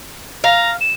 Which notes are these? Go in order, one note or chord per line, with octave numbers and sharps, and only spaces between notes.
F5 A#5
E7